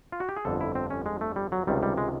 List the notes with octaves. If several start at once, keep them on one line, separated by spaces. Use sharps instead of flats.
F4
F#4
G4
G#4
G1 F2 D3 A4
E4
C4
C#4
G#3
A3
G3
F#3
C#2 C3 D#3 G3
G3
G#3